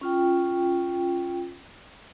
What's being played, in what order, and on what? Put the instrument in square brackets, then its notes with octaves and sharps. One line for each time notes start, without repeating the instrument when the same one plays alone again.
[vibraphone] C#4 F4 G5